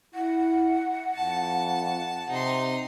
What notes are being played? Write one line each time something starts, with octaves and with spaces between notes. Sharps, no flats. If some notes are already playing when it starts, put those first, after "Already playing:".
E4 F#5
F2 A5
C3 D#4 C6